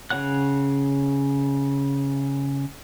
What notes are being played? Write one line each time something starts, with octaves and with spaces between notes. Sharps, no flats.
C#3 F4 C#5 F#5 F#6